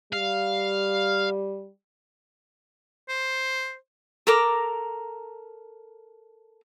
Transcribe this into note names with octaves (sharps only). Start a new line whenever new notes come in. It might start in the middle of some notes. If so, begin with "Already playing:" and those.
G3 F5
C5
A4 A#4 A#5 D6